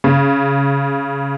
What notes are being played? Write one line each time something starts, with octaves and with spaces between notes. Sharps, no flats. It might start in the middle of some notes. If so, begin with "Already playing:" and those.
C#3